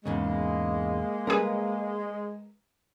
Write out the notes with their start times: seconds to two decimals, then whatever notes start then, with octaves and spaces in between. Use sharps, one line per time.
0.05 E2 G#2 C#3 G#3 A#3
1.27 C#3 G3 G#4 A#4 B4